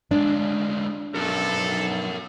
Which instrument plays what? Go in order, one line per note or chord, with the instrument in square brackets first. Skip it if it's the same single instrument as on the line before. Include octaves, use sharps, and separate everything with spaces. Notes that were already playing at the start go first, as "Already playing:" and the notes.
[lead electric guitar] D2 G#3 [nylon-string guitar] D4
[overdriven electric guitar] B1 [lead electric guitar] F#4 A#4 [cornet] A4